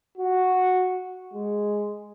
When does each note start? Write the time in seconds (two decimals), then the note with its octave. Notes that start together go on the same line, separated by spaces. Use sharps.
0.18 F#4
1.33 G#3